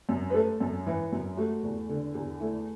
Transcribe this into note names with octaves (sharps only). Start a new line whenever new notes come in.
F#2
B4
A3 A4
F#2
E3
F#2
A3 F#4
E2
D3
E2
A3 E4